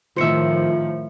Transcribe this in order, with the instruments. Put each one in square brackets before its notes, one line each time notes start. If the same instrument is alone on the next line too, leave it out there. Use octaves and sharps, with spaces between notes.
[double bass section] A2 D#3 F3 [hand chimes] F4 C#7 [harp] C5 E5